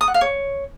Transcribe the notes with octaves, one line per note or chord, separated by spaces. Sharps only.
D#6
F#5
F5
C#5